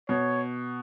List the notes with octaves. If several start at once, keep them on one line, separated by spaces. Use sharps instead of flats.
B2 C#5